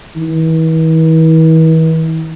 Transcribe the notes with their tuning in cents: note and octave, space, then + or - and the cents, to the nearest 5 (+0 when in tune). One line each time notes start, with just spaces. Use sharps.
E3 -40